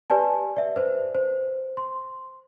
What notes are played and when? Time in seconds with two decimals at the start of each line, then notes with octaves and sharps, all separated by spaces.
0.10 G4 B4 D5 G#5 A5
0.57 D5 E5
0.76 B4 C5
1.15 C5
1.77 C6